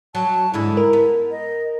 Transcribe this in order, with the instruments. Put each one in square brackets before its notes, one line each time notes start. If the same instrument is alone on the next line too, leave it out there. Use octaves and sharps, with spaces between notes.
[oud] F#3 [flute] A5
[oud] G#2 D3 G#3 [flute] E4
[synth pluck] A#4
[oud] B3
[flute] D#5